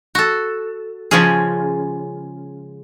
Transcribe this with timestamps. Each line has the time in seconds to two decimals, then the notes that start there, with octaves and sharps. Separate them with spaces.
0.15 F#4 A4
1.11 C#3 F3 G#3 C#4 G#4